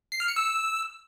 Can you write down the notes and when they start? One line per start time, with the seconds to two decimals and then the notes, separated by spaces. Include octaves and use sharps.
0.12 C7
0.20 F6
0.28 C#7
0.36 E6